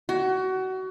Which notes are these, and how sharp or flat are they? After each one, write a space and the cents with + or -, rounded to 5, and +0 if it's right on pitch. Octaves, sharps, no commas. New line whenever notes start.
F#4 +25